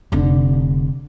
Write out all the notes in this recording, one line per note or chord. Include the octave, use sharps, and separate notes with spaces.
F1 D3